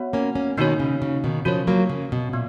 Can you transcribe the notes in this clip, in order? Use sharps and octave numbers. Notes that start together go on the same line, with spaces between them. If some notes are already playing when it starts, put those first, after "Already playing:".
Already playing: B3 F#4 C#5 F#5
A#3 C#4
A#3 C#4
B2 D#3 A#3 D#4 F#4 C#5
C#3
C#3
B2 D#3
C#3 F3 F#4 A#4 C#5
F#3 A#3
C#3
B2
A#2 B3